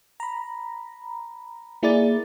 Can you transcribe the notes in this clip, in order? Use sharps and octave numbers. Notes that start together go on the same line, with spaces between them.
A#5 B5
A#3 E4 G#4 A#4 D5 A6